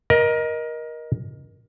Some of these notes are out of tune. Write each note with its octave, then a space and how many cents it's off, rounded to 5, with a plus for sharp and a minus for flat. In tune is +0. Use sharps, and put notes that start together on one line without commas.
A#4 +25 D#5 +0